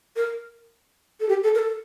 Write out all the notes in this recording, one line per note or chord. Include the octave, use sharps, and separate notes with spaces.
A#4
A4
G4
A4
A#4
A4